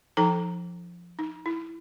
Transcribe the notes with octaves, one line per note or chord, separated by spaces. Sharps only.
F3 D#4 A4 G5 A#5
D#4
E4